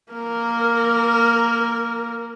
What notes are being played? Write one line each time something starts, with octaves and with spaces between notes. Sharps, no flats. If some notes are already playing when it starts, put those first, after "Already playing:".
A#3 A#4